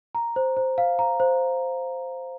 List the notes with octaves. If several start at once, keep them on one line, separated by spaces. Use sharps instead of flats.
A#5
C5
C5
F5
A#5
C5